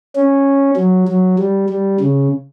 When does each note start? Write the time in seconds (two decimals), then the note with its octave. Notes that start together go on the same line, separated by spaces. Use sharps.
0.16 C#4
0.77 F#3
1.08 F#3
1.39 G3
1.69 G3
2.00 C#3